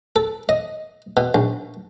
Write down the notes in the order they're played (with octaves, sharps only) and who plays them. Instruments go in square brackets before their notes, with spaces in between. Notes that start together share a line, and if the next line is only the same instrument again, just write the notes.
[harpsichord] A4
D#5
B2
A#1